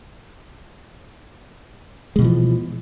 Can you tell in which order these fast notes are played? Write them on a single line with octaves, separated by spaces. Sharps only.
G#3 B2 E3 F3